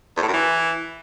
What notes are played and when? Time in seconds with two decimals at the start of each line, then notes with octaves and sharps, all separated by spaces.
0.17 E2
0.22 A2
0.28 F#2
0.34 E3